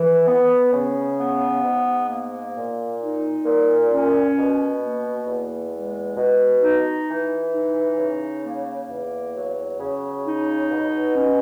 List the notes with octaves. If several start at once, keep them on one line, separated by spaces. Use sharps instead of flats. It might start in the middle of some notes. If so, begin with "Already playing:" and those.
Already playing: E3
B3
C#3
B3
G#2
A#3
A#2
D#4
A#2
C#4
B2
A#3
E2
G#3
B2
D#4
E3
D#4
C#3
A#3
E2
F#3
C#3
D#4
B2
C#4